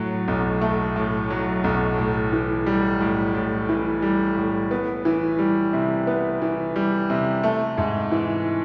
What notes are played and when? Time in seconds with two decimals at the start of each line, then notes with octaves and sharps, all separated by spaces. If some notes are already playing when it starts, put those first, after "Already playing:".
Already playing: A2 F#3
0.28 B1
0.61 A3
0.96 A2
1.30 F#3
1.64 B1
1.98 A2
2.32 E3
2.66 G3
3.00 A2
3.35 A2
3.69 E3
4.02 G3
4.37 A2
4.71 B3
5.05 E3
5.39 G3
5.73 C3
6.07 B3
6.42 E3
6.76 G3
7.10 C3
7.43 A3
7.78 G#2
8.11 E3